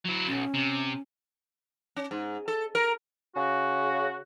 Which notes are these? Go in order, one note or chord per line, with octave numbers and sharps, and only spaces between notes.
F#3 E4
B1 C#4
C3
C#4
G#2
A4
A#4
C#3 F#4